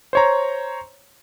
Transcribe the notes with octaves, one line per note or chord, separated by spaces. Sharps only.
C5 C#5 A#5